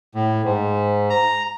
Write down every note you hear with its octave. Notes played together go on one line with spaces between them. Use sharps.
A2
G#2
A#5